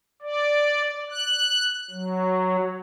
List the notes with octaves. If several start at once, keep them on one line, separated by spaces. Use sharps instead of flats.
D5
F#6
F#3